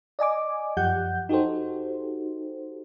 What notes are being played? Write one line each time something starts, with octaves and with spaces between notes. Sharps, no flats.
D5 D#5 G#5 D6
F#2 F3 G4 F#5 G6
D#4 F#4 G4 A4 C5